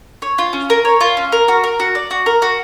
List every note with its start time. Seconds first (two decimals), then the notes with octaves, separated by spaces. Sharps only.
0.22 C#5
0.38 F4
0.53 C#4
0.70 A#4
0.85 C#5
1.01 F4
1.17 C#4
1.32 A#4
1.48 F#4
1.64 A#4
1.80 F#4
1.95 D5
2.11 F#4
2.26 A#4
2.42 F#4